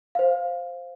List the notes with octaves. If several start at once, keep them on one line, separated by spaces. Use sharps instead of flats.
C5 F5